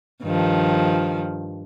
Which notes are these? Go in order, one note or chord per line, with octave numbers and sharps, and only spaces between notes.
G2 D#3 F3